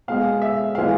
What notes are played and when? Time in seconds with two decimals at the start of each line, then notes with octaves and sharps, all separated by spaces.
0.08 B2 G#3 F5
0.42 E5
0.75 E3 G#3 F5